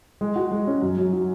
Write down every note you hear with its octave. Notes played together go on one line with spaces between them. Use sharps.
G#3
F#4
G#3
C#4
F#2
F#2
F#3